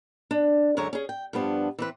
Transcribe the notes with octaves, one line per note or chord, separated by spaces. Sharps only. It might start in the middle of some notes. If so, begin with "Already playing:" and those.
D4
F#2 D3 G#3 C#5 A#5
C#4 G#4
G5
G2 F3 B3 D4
E3 C4 B4